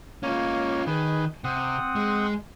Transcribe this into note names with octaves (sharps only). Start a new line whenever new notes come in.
A#3 C#4 F4 C#5
D#3 G#4 B4
C3 C4 F#5 D#6
G#3